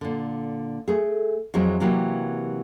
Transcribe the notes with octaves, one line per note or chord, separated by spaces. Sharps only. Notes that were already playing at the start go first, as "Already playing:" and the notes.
A#2 D3
A3 G#4
F2 E3 F#3 G#3 C4
C3 E3 F#3 A#3 G4